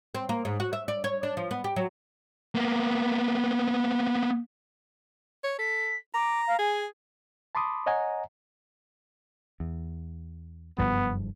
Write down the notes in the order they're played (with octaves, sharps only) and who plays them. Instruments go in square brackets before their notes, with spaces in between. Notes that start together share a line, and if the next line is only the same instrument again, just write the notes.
[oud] C4
A#3
G#2
F#4
E5
D5
C#5
D4
F3
B3
G4
F#3
[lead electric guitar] A#3 B3
[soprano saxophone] C#5
[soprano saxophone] A4 [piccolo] B6
[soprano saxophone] A#5 [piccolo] D6
[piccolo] F5
[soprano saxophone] G#4 [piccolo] G#5
[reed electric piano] A5 B5 C6 D6 D#6
C#5 D#5 F#5 G#5 A#5
[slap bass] E2
[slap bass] F#1 G2 F3 [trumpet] B3